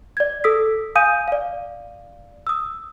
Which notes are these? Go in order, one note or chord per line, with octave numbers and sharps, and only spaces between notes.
D5 G#6
A4 D#6 E6 B6
F5 G#5 D#6 G6 D#7
D5 F5
D#6 E6